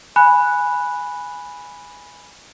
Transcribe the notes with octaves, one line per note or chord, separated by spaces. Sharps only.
G#5 B5 F#6